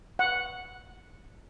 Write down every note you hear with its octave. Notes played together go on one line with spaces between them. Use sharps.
F#5